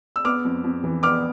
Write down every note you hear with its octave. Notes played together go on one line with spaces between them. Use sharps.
E6
B3 D6 F6
F2
F2
E3
B3 D6 F6